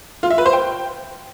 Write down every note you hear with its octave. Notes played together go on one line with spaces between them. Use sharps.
F4
E5
B4
C5
G5